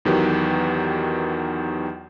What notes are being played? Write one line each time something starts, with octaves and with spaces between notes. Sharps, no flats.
E2 D#3 F#3 G4 B4